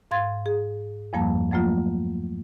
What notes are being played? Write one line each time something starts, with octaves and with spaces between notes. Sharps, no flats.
G#2 F5 C6 G#6 A6
G#4
E2 G2 F3 G3 A#3 A5
F3 F#3 A3 A#3 F4